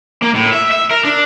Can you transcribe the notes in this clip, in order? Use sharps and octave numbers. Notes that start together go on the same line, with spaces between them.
A#3
A2
E5
E5
A#4
D4